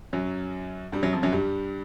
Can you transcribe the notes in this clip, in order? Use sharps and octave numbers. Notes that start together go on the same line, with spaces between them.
F#2 F#3
G2 G3
F#2 F#3
F2 F3
F#2 F#3
G2 G3